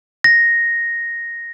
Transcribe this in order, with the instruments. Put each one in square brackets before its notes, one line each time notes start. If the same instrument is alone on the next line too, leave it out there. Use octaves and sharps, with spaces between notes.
[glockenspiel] A#6